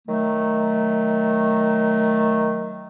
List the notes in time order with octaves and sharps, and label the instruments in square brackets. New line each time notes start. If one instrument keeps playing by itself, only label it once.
[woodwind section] D#3 F#3 A3